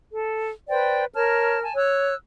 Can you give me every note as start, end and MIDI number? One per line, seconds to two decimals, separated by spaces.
0.13 0.50 69
0.70 1.05 71
0.70 1.05 72
0.70 1.05 74
0.70 1.05 79
1.14 1.61 70
1.14 1.61 73
1.14 1.61 81
1.14 1.61 89
1.62 1.74 80
1.62 1.74 81
1.75 2.14 73
1.75 2.14 88
1.75 2.14 90